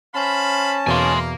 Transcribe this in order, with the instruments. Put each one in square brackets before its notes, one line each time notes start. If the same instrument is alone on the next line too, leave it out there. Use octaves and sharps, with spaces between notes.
[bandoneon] C#4 A5 [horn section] C5 F5 B5
[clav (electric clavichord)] E2 B2 [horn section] A#3 [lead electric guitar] G#5 C6